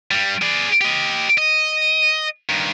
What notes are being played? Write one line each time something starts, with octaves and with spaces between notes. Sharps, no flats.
G2 G3
G#4 D5
G4 D#5
D#5
G2 D#3